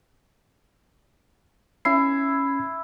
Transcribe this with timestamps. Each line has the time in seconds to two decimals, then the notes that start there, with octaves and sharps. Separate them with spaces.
1.85 C#4 E4 C7